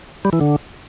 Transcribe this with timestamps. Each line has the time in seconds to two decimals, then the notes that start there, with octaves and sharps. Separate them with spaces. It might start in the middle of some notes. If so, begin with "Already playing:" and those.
0.25 G3
0.33 E3
0.41 D3